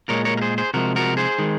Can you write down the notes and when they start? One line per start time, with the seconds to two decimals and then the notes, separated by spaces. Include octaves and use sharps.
0.09 A#2 G#3 A#4 C#5
0.25 A#4 C#5
0.37 A#4
0.41 G#4 C5
0.58 G#4 C5
0.74 C3 F3 G#3 F#4 A#4
0.96 F#4 A#4
1.17 G#4 C5
1.38 D#3 G#3